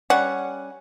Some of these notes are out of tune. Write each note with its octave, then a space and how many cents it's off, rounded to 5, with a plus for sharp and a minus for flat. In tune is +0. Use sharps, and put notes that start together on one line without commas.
G3 +0 C#4 +0 F#5 +0